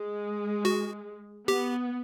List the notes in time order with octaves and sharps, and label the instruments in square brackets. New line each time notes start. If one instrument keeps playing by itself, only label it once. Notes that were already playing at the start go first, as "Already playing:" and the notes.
Already playing: [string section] G#3
[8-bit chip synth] F#4
[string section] B3 [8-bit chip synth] G4